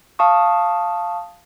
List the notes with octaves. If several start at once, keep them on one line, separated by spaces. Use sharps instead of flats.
F5 A5 C#6 D#6